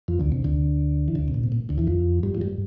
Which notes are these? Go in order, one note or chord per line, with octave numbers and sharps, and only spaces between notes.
F2 F3
D2 D3
C3
D2 D3
E3
D2 D3
C3
A#2
C3
A#2
D2 D3
E2 E3
F2 F3
G2 G3
F3
G2 G3